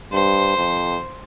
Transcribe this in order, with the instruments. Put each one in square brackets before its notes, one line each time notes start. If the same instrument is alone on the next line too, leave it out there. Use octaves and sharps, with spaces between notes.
[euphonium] G2 [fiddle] C5
[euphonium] F2